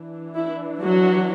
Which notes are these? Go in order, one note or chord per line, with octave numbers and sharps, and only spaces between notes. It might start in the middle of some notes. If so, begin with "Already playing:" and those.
Already playing: E3 D4
E4
F#3 F#4